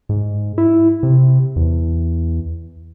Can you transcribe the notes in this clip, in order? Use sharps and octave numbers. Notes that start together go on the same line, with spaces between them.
G#2
E4
C3
E2